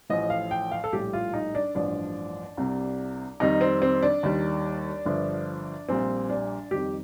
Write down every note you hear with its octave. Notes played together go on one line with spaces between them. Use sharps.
A1 A2 F3 D#5
F5
G5
F5
A4
A#1 A2 G3 G4
F4
D#4
D4
A1 G2 F3 D4
C2 C3 G3
F2 D#3 G3 D#4
C4
C4
D4
D#2 D#3 G3
G1 G2 F3
A#1 A#2 G3 C4
D4
F2 D#3 G3 G4